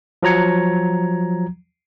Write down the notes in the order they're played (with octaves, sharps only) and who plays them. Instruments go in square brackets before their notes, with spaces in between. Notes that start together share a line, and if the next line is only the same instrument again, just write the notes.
[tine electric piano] F3 F#3 A#5 G#6 C#7